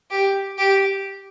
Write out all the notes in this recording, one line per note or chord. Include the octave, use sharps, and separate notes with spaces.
G4
G4